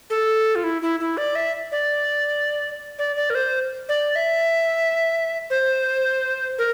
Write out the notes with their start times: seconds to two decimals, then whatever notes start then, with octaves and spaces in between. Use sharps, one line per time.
0.10 A4
0.55 F4
0.64 E4
0.82 E4
1.00 E4
1.17 D5
1.35 E5
1.72 D5
2.99 D5
3.16 D5
3.30 A#4
3.35 C5
3.89 D5
4.16 E5
5.50 C5
6.58 A#4